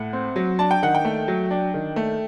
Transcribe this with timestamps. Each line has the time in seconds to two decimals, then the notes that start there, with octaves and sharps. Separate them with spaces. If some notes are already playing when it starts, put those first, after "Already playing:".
Already playing: A2 F#5
0.13 C4
0.36 F#3
0.59 D4 A5
0.71 G5
0.83 D#3 F#5
0.95 G5
1.05 A3
1.28 F#3
1.51 D4
1.74 D#3
1.96 A3